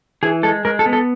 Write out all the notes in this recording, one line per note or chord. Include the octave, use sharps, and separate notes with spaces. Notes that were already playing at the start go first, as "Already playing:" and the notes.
E3 G#4
G#3 A4
G#3 A#4
A4
B3
A4